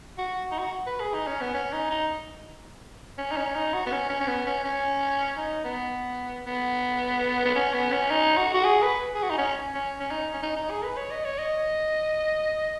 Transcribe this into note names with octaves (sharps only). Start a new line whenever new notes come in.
F#4
D#4
F#4
B4
G#4
D#4
C#4
B3
C#4
D#4
D#4
C#4
D#4
C#4
D#4
F#4
B3
C#4
C#4
C#4
B3
C#4
C#4
D#4
B3
B3
B3
C#4
B3
C#4
D#4
F#4
F#4
G#4
B4
G#4
F#4
D#4
C#4
C#4
C#4
D#4
C#4
D#4
D#4
G#4
B4
C#5
D#5
C#5
D#5